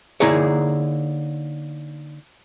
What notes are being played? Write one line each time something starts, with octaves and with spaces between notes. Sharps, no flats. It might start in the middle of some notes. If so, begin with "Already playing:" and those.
D3 A#3 D#4 E4 G#4 C#5